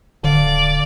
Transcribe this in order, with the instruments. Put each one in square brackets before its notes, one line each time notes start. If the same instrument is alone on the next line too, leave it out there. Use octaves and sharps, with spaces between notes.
[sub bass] D1 [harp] D3 F5 [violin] D5